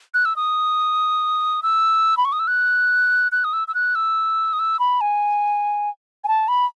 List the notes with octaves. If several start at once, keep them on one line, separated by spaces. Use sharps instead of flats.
F#6
E6
D#6
E6
B5
C#6
D#6
E6
F#6
F#6
D#6
E6
E6
F#6
E6
D#6
E6
B5
G#5
G#5
A5
B5